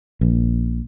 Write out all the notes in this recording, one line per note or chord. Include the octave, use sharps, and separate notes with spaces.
A#1